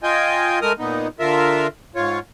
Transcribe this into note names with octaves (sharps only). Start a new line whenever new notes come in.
F4 D#5 G5 G#5
G#3 A3 A#4 D#6 F6
A#2 B3 D#4
D3 F4 A#4 E5
G#2 F4 C#5